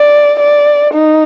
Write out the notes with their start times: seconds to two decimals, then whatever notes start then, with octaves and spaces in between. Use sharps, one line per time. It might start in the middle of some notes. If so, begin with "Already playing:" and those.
Already playing: D5
0.39 D5
0.94 D#4